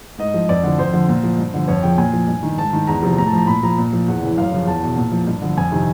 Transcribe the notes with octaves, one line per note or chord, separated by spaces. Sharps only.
G#2 D#5
F3
F2 D5
D3 F3
F2 C5
D3 F3
A#2
F3
G2
D3 F3
F2 C#5
C#3 F3 G5
A#2 G#5
F3
G2
D#3
G#2 A5
D#3
E2 A#5
C3 F3
A2 A#5
A5
F3 A#5
A#2 B5
F3 A#5
A#2
F3
E2 F#5
C#3 E3
F#2 F5
C#3 F3
E2 A5
B2
A#2
F3
G2
D3 F3
F2 G#5
C3 D#3